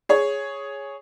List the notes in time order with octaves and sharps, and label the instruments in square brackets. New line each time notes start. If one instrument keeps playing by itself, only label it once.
[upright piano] G#4 C#5